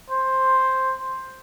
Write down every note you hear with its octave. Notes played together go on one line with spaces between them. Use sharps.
C5